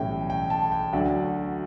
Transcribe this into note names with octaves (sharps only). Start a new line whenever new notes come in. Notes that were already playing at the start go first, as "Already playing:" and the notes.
Already playing: B1 A2 E3 G3 C#4 G5
G5
A5
G5
D2 D3 F#3 D5
F#4